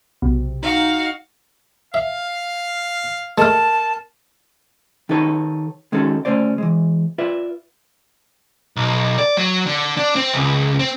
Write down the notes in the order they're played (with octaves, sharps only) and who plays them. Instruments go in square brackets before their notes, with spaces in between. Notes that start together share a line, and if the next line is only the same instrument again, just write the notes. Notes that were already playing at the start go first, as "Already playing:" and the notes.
[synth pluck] B1 [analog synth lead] C3
[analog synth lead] D#4 [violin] F#4 F5
[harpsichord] E5 [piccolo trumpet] F5
[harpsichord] G#3 A3 [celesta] A#4 F6 [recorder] A5
[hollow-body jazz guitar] D#3 D#4 G4 A4 B4 C#5
D#3 G#3 C#4 D#4 F#4 A4
D2 F#3 A3 C#4 C5 D5
E3 G#3
F4 B4 D5 E5
[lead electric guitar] B1
D5
F#3
D3
D4
C4
C#2
C4